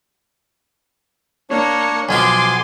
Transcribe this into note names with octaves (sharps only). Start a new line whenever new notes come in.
A#3 D4 C#5 C#7
B1 F3 B3 G#5 C6 D6